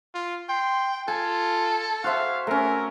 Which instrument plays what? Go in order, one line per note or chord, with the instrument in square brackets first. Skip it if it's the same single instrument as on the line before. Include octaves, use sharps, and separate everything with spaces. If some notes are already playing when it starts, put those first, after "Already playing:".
[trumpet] F4
[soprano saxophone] G5 [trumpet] C6
[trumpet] F4 [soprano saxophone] A4 [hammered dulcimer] G#5
[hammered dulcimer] F#4 C5 E5 [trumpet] F5
[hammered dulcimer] A3 C#4 [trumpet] A#4